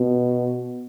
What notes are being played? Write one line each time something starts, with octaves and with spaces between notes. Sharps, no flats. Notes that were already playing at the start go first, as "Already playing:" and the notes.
Already playing: B2